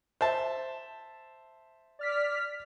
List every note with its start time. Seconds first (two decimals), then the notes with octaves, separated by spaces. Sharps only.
0.21 C5 E5 A5
1.99 D5 F6 B6